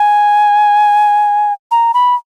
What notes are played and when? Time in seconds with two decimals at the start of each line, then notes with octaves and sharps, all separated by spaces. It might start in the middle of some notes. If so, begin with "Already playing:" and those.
Already playing: G#5
1.71 A#5
1.94 B5